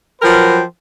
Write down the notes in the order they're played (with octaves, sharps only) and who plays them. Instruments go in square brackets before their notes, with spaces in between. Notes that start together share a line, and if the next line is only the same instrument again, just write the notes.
[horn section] F3 F#3 A#4 B4 G5